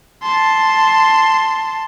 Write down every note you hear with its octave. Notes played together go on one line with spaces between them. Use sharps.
A5 C6